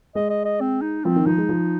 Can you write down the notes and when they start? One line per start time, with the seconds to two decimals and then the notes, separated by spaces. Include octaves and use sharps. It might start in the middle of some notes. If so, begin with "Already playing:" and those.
0.15 G#3 D#5
0.30 D#5
0.45 D#5
0.60 C4
0.82 D#4
1.05 F3 C4
1.16 D#3
1.26 F3 D#4
1.38 G#3
1.49 F3